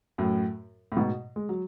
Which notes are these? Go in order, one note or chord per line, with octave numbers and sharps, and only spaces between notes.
F#2 A2
A2
G#2 B2
G#3
F#3